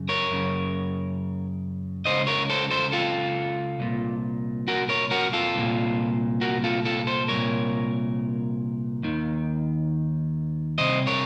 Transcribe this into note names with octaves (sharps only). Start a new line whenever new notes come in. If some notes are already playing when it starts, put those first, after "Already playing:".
Already playing: F#2 C#3
A#4 C#5
F#2 C#3
C#2 C#3 C5 D#5
A#4 C#5
A4 C5
A4 C5
F4 A4
C2 A#2
F#4 A#4
A#4 C#5
F#4 A#4
F4 A4
C2 A#2
F#4 A#4
F4 A4
F4 A4
A4 C5
C2 A#2 A#4 C#5
D#2 D#3
C2 C3 C5 D#5
A#4 C#5